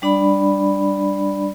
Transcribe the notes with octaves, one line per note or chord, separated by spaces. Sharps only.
G3 D4 D5 B5